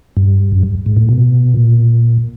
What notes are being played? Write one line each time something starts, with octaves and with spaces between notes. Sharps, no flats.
G2
F#2
G2
G#2
A2
B2
A#2